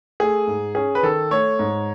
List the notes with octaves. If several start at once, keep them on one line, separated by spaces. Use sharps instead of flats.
A3 G#4
G#2
C#4 G#4
B4
D#3 A4
A3 C#5
G#2